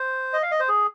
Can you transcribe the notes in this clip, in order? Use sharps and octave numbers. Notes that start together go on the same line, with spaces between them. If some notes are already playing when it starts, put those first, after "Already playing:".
Already playing: C5
D#5
F5
D#5
C5
G#4